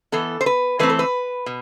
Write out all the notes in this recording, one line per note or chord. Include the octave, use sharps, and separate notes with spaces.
E3 B3 A4
C5
B4
E3 A3 C4 B4
A4
B4
B2